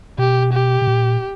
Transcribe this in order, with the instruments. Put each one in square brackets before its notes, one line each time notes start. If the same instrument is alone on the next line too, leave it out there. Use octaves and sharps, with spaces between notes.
[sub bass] B2 [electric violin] G4
[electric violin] G4
[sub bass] B2
A#2